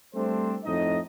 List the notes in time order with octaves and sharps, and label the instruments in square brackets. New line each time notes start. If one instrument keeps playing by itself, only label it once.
[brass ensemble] G3 A3 C4 D4 C5
F2 A2 D#4 D#5